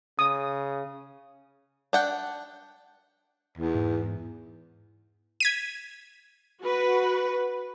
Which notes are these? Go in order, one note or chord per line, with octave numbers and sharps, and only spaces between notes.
C#3 D#6
D4 F#5 G5
E2
G#2
G#6 B6 D#7
F#4 B4